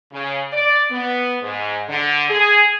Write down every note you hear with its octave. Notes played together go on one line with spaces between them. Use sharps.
C#3
D5
B3
G#2
D3
G#4